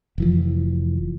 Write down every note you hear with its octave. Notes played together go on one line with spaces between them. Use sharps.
F1 E3 F3